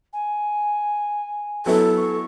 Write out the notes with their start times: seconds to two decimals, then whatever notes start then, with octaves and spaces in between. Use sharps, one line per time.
0.13 G#5
1.66 F#3 B3 E4 A4
1.97 C#6